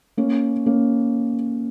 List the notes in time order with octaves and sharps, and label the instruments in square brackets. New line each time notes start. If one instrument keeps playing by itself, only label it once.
[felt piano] A#3 C#4
A#3 C#4